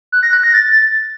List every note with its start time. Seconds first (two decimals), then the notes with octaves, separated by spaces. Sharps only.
0.12 F#6
0.23 A#6
0.33 F#6
0.43 A#6
0.54 A6